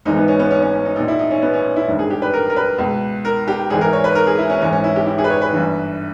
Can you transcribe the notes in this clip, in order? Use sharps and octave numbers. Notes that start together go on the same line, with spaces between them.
G#1 G#2 E3 D#4
B3
C#4
B3
C#4
C#4
C#4
D#4
A#1 A#2 D#4
E4
D#4
C#4
B3
C#4
E4
G#1 G2 D#3
G#4
G4
B4
A#4
A#4
B4
C#2 B2
A#4
G4
G#1 G#2 E3 G#4
A#4
C#5
B4
A#4
G#4
E4
C#4
G#1 G#2 E3 C#4
C#4
E4
G4
E4
G#4
B4
C#5
B4
G1 G2 E3